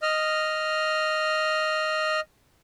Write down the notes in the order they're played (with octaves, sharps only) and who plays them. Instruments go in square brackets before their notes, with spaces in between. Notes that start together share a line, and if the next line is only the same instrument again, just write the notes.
[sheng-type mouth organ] D#5 F6